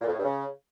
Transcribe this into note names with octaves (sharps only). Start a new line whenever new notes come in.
A#2
F2
A2
G2
C#3